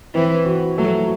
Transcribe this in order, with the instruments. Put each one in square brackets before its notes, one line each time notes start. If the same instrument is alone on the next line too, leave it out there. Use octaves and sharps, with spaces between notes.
[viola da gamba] E3 [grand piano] C4
[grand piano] F#4
[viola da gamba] F#3 [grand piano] A3